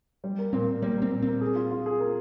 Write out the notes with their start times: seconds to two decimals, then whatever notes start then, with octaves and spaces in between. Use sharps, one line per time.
0.24 G3
0.38 A#3
0.53 A#2 C4
0.67 A#2
0.82 G3 A#3
0.97 A#3 C4
1.12 A#2
1.22 A#3 C4
1.41 G#4
1.56 F4
1.71 F4
1.86 G#4
2.00 A#3